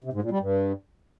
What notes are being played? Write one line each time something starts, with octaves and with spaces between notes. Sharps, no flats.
C3
G#2
A#2
G3
G2